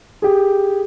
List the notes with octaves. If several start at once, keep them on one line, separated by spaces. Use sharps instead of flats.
G4 G#4